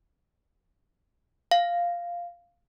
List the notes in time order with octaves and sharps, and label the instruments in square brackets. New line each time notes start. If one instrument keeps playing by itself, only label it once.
[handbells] F5